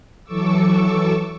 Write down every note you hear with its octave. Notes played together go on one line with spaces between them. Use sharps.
E3 F#3 A4 C#6 D6 E6